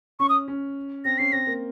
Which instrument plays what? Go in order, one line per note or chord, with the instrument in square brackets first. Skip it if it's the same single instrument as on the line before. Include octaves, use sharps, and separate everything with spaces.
[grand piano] C#4 [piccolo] C#6
[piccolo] D#6
[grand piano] C#4
[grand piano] C4 [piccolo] A#6
[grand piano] C#4 [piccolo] C7
[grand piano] C4 [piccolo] A#6
[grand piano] A#3